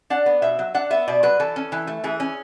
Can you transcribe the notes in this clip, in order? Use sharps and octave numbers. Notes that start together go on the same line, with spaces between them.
D4 F#5
B3
B2 E5
F#3
D4 F#5
B3 E5
B2 D5
F#3 B4
E3 A4
C#4
E3
A3
E3 G#4
C#4